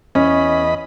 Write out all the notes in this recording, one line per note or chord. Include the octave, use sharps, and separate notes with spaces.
E2 C#4 D#5 B5